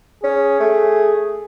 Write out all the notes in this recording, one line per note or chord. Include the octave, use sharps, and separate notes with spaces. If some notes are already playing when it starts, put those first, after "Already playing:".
C#4 G#4
A3